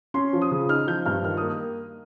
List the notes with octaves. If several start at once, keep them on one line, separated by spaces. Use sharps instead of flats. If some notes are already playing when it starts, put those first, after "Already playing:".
C#4 C6
F3
D#6
C#3
D#4 F6
F3 G6
G2 F6
D#3 F6
A#3 D#6